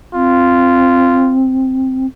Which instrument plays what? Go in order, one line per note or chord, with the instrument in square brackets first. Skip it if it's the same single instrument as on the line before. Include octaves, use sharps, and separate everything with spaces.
[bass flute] C4 [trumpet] F4